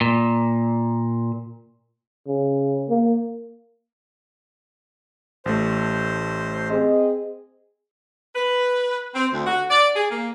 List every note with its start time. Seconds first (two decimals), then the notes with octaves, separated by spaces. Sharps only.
0.01 A#2
2.27 C#3
2.88 A#3
5.46 A1 A3 C5
6.70 C4 G#4 D#5
8.36 B4
9.15 C4
9.33 D2
9.46 F#4
9.70 D5
9.96 G#4
10.11 A#3